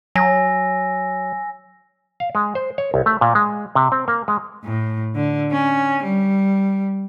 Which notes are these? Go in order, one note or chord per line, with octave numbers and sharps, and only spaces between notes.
F#3 G#5 E6 A#6
F5
G#3
C5
C#5
C2
A3
A#2
G#3
C3
C4
A#3
G#3
A2
D3
C#4
G3